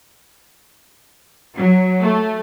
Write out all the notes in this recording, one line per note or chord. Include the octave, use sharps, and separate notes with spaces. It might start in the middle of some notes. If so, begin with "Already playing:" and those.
F#3
A3